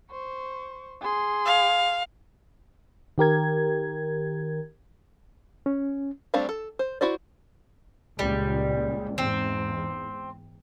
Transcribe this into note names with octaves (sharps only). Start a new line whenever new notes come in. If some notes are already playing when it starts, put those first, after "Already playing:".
C5 C#6
G#4 C6
F5
D#3 G4 A#4 G#6
C#4
G3 A3 C4 D4 F5
A4
C5
E4 F#4 C5 D5
C#2 A#2 G3
E2 G#2 C4